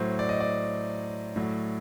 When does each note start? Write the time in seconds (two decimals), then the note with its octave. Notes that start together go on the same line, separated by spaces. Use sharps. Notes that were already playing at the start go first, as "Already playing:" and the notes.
Already playing: A2 F#3 C5
0.19 D5
0.29 D#5
0.40 D5
1.36 A2 F#3